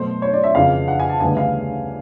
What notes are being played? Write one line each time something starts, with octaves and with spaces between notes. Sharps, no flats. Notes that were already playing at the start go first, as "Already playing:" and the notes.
Already playing: B2 F#3 A3 C5
C#5
D5
E5
F2 C#3 E3 F5
F#5
G#5
A5
D2 C#3 E3 G3 B3 G#5
F5